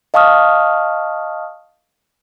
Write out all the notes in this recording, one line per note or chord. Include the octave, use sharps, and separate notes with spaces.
D#5 F5 A5 C#6 D#6 F6